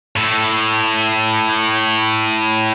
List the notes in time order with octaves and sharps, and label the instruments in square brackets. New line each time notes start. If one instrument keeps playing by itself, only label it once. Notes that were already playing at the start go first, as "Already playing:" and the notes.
[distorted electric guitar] A2 A4